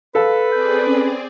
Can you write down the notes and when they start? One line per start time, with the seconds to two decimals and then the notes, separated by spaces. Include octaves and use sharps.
0.15 A4 B4 F5
0.52 C4 G#4 D5 G6
0.87 C#4